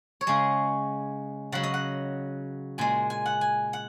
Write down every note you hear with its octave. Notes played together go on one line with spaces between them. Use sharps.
C#5
C#3 G#3 D#5
C#3 F#3 F#5
D#5
F#5
A#2 G#3 G#5
G#5
F#5
G#5
F#5